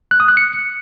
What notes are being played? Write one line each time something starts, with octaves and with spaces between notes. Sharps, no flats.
F#6
D#6
F#6
C#7